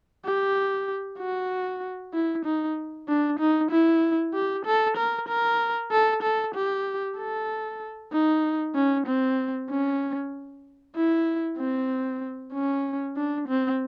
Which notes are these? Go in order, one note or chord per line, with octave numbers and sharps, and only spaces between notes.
G4
F#4
E4
D#4
D4
D#4
E4
G4
A4
A#4
A#4
A4
A4
G4
A4
D#4
C#4
C4
C#4
E4
C4
C#4
D4
C4